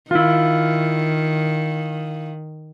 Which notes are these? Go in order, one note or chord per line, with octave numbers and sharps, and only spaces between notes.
D#3 E4 F4